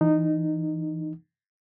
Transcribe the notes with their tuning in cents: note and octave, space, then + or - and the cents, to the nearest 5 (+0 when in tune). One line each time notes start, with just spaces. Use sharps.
E3 +0 D#4 -15